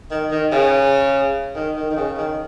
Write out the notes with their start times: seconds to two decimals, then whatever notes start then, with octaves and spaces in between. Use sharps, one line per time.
0.11 D#3
0.31 D#3
0.52 C#3
1.55 D#3
1.76 D#3
1.90 D#3
1.97 C#3
2.18 D#3